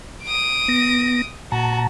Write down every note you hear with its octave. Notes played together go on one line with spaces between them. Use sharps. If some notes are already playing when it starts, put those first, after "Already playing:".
D#6 D7
B3 A#6
A#2 F#4 A5 A#5